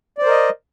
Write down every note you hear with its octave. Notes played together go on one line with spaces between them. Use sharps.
A#4 C5 D5 D#5